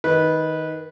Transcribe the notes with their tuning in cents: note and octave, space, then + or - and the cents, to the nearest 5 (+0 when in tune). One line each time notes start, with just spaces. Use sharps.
D#3 +15 B4 -10